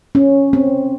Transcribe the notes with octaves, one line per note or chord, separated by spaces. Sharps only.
C#4
C4